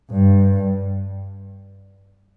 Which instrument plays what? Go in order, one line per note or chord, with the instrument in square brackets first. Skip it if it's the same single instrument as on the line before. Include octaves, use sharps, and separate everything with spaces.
[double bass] G2